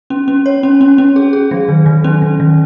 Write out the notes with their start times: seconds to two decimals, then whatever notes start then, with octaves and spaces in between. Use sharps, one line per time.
0.10 C#4
0.28 C#4
0.46 C#5
0.63 C#4
0.81 C#4
0.98 C#4
1.16 G#4
1.33 G#4
1.51 F#3
1.68 D#3
1.86 D#3
2.04 C#4
2.22 D#3
2.40 D#3